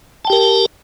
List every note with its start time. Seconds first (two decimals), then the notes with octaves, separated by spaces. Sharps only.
0.25 A5
0.27 G5
0.30 G4
0.32 A#4